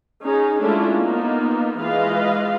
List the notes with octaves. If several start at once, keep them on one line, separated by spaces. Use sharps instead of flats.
C#4 D#4 G#4
G#3 A3 C#4 D4 E4 F4
A#3 B3 D#4 F4
E3 G#3 F4 B4 D#5 F5